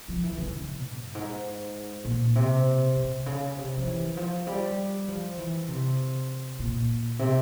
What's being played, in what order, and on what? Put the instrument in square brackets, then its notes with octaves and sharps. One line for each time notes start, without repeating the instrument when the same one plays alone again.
[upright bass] F3
E3
C#3
G2
G#2
A#2
C3
C3
C#3
C3
F3
E3
F3
G3
F3
E3
C3
A#2
C3